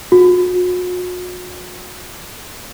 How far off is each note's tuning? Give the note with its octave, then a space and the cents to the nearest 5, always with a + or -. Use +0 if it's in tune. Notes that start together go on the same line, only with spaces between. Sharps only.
F#4 -40